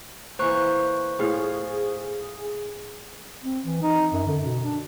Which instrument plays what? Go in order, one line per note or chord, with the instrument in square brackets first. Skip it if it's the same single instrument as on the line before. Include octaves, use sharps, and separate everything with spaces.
[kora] E3 A#3 [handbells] C5 C#6 F#6
[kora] A2 F4 F5 [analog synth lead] G#4
[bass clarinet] C4
E3
D#4
F#2
D3
B2
D4